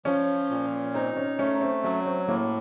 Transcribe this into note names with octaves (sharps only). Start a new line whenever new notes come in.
F3 C#4
A#2
C4 D#4
C#4
A3 C#4
C4
F#3 C#4
C4
A2 A#3